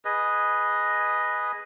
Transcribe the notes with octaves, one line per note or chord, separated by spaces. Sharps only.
G#4 B4 D#5